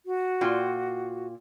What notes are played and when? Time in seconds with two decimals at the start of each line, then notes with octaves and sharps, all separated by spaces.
0.06 F#4
0.41 A#2 F4 G5